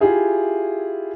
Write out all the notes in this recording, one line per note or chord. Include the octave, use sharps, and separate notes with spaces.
E4 F4 G4 G#4 E5